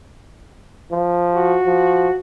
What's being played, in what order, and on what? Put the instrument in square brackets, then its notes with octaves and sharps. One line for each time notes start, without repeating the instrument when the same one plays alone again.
[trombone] F3
[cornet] F#4
[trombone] F3